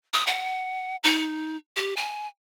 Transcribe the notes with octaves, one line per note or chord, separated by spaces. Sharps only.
D#6
F#5
D#4
G4
G#5